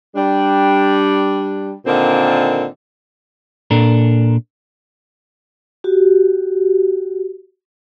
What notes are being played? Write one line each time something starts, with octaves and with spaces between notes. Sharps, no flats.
G3 D4
A#2 D3 D#3 C4
A#2 D4 A4 A#4
F#4 G4